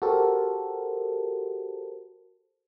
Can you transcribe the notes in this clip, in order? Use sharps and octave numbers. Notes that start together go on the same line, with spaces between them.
F#4 G4 A4 A#4 C5